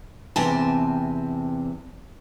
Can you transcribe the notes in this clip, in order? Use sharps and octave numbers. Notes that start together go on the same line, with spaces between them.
E2 C3 C4 G#5 A5